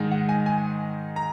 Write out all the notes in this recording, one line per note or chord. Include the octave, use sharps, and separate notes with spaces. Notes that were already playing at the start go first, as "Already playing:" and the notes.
Already playing: G#2 D#3 G#3 D#4
F#5
G#5
G#5
A#5